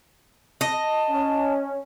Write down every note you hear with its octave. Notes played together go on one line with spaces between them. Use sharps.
D#5 A5
C#4